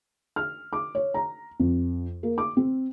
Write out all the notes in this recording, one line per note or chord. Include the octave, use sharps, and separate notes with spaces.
F6
D6
C#5
A#5
F2
A#3
D6
C4